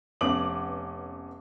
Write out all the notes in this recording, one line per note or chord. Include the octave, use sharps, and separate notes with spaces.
F1 B3 C#4 D6 F#7